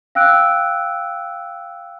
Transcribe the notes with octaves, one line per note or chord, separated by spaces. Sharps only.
F5 G5 E6 F#6 D7